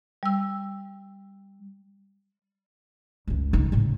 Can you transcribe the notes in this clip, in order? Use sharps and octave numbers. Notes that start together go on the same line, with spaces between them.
G3 E6
C#2 F#2
C#3 D#4
A2 C#3